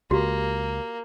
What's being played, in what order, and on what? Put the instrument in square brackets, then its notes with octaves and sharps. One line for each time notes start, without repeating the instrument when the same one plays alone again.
[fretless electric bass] C#2 [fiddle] A#3 [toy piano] F#4 G4